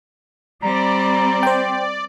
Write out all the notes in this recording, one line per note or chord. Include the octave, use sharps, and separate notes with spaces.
G3 C4 D5 A#5
C5 G5